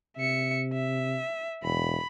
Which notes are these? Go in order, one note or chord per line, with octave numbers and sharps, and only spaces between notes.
C3 E5 C#7
E5
E1 B5